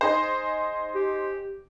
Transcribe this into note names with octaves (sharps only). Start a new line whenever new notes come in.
D#4 G#4 C5
G4